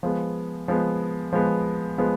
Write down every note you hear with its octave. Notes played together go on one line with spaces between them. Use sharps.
F3 G#3 B3
F3 G#3 B3
F3 G#3 B3
F3 G#3 B3